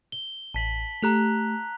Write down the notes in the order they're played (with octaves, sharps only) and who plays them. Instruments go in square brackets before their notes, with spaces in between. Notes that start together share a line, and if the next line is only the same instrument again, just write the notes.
[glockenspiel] G7
[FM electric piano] A1 [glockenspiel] A5 B6 F#7
[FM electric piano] A3 G4 [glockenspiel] A#5 F#6 F7